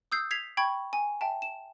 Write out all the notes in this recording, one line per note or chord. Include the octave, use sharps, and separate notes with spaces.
D#6 E6 G6 C7
G#6 B6 C7 F7
G5 B5 C#6 G#6
G#5
E5 G5 A5
E7